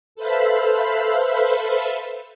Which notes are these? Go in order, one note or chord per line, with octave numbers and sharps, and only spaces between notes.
A4 B4 C5 E5 F5 B5